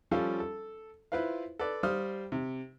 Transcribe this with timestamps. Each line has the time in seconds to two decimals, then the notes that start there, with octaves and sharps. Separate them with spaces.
0.11 F3 G3 C#4 F4 A4 F5
0.40 A4
1.12 E4 F4 B4 C5 F5
1.59 A4 B4 D5
1.83 G3 C5 F5 D#6 F6
2.32 C3